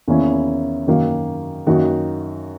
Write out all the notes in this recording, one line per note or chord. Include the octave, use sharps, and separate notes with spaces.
E2 D#3 A#3 C#4 E4
F#2 D#3 A#3
F#2 D#3 A#3 D#4 F#4